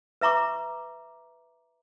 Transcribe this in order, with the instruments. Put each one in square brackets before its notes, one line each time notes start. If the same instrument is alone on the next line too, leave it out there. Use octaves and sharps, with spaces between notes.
[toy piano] B4 E5 A#5 C#6 D6